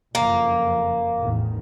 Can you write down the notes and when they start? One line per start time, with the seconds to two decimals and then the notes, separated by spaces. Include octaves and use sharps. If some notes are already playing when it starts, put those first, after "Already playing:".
0.15 F#1 F2 A#3
1.20 A1 E2 D#3